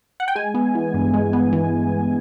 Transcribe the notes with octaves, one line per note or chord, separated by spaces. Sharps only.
F#5
G5
G#3 G#5
B3
E3
G2
G#3
B3
E3